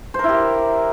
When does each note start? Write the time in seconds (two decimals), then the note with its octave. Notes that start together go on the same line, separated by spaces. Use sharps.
0.14 C5
0.19 A#4
0.24 E4
0.29 G4